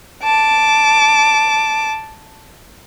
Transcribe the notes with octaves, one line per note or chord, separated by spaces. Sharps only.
A5 D6